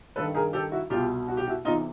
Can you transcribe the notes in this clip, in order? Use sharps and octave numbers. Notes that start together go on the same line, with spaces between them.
G2 D#3 A4 B4
G#4 A#4
G4 A4
E4 F#4
C2 B2 F4 G4
F#4
G4
E4 F#4
E2 C3 E3 D#4 F4